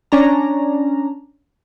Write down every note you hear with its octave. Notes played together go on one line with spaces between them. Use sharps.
C#4 D4 A#5